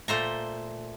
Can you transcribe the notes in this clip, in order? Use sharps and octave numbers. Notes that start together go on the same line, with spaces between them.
A#2 A3 C5 A#5